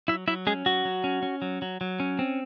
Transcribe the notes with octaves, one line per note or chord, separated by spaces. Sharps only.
F#3 E4 E5
F#3 E4 E5
G#3 C#4 G#4
F#3 F#4
F#3
C#4
C#4
F#3
F#3
F#3
C#4
C4